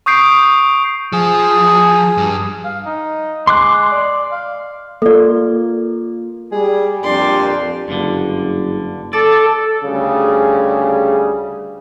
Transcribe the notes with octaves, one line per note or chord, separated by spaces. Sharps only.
C#6 D#6 G6 C7 D7
F3 G#4
G2
F5
D#4
G#3 C6 D6 F#6
D5
F5
A#3 F4 A4 D5
G3 G#4
F2 A#2 D4 G4 D5 C6
F#1 G2 D3
A4 D5
D2 C#3 G3 G#4